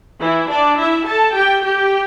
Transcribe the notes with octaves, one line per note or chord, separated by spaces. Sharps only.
E3 E4
D4 D5
E4 E5
A4 A5
G4 G5
G4 G5